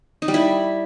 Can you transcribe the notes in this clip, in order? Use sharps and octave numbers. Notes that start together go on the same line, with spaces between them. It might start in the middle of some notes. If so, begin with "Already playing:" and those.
D#4
G3
E4